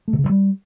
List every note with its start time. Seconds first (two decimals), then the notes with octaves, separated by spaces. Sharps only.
0.08 A3
0.13 C3
0.19 C#3
0.24 G2
0.29 G3